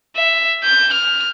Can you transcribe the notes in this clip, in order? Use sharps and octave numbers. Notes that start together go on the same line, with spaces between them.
E5
G6
F6